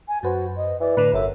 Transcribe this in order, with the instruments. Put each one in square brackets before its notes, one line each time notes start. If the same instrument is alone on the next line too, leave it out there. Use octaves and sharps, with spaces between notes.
[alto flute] G#5
[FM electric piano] F#2 B4 C5 [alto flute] F#4
[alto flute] D#5
[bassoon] E3 [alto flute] D5
[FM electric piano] A2 D3 [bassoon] B4
[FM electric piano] G1 A4 [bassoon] F#2 [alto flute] E5